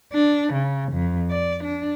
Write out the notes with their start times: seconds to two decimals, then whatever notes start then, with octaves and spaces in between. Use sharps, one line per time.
0.13 D4
0.53 C#3
0.93 F2
1.30 D5
1.64 D4